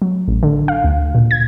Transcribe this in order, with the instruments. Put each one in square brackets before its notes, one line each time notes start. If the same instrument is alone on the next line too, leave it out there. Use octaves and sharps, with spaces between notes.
[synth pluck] F#3
A1
D3
F5
D2
A#2
G#6